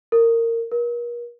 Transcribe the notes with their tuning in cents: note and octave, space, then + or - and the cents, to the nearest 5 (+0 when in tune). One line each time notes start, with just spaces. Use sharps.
A#4 -20
A#4 +40